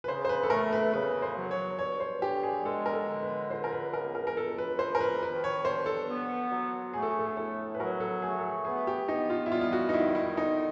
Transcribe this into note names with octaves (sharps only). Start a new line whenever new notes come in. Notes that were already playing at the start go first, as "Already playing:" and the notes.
B4
C#3 C5
C5
B4
A4
A3 A#4
B4
C#3 B4
C5
F#3
C#5
G2 C#5
C5
D3 G4
G#4
G#3 A4
A#4
A4
D3
B4
C#2 C5
A#4
B4
C#2 A#4
A#4
A#4
C#2 A4
B4
F3 C5
A#4
B4
D#3 B4
C#5
G2 C5
A4
B3
F#3
A3 G#4
A4
G#4
A4
G#4
A2 A4
B4
F#3 A#4
A4
A3 G#4
A4
G#4
B3 G#4
G4
B3 D#4
F4
E4
G3 F4
F4
F#4
D#4
D#3 E4
E4
D3 D#4